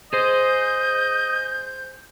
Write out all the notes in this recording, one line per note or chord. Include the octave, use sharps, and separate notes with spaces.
G#4 C5 D#5 G6